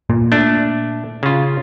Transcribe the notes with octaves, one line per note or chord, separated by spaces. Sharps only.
A#2
A3 D4
C#3 F4